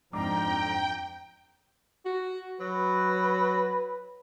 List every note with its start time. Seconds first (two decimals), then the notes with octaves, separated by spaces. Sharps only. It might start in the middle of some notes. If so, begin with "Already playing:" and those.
0.13 F2 G#2 D4 G5 A#5 D6
2.05 F#4
2.60 F#3 B4